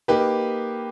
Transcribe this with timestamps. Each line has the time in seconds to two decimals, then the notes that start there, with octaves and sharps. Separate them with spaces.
0.08 A#3 D#4 G4 B4